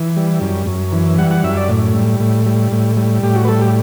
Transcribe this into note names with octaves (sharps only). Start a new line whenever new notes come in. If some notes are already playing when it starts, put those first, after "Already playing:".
Already playing: E3
G3
F#2
F#2
E3
G3 F#5
F#5
F#2 E5
D5
A2
G3
A2
G3
A2
G3
A2 G4
F#4
B4
G3 A4
G4